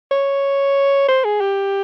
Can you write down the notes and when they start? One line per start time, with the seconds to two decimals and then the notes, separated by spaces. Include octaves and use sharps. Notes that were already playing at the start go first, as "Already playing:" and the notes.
0.11 C#5
1.08 C5
1.25 G#4
1.41 G4